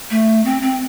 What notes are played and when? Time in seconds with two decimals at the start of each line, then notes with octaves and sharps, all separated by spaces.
0.11 A3
0.45 C4
0.62 C4